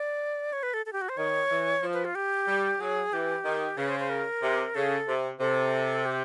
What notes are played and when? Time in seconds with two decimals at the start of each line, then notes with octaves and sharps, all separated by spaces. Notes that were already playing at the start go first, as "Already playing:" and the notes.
Already playing: D5
0.53 C#5
0.63 B4
0.74 A4
0.86 A4
0.93 G4
1.01 F#4
1.09 C5
1.17 D#3 C#5
1.51 E3
1.83 F3
1.94 B4
2.05 F4
2.15 G4
2.48 G3
2.80 F#3 G#4
3.13 E3 G4
3.45 D#3
3.78 C#3 B4
3.89 C5
4.00 C5
4.10 A#4
4.42 C3
4.75 C#3 A4
5.08 C3
5.40 C3 A4
6.05 G4